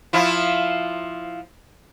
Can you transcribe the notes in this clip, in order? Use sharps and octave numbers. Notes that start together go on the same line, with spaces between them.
F3 E4 F4